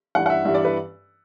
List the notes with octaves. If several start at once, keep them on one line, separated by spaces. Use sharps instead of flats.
G2 E3 G3 F#5
F#5
E5
G2 E3 G3 E5
D5
B4